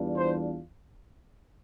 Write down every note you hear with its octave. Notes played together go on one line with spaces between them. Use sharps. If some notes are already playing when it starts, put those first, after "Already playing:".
Already playing: E2 E3 G3 D4 F4
C5